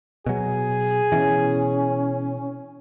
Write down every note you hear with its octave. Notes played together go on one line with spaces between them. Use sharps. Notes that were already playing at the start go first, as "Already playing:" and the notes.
B2 F#3 G#4
B2 E3 C#4